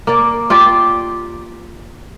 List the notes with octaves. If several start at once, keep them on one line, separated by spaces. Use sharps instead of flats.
A#3 D5
F4 G4 D5